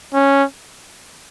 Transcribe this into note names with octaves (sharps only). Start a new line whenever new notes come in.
C#4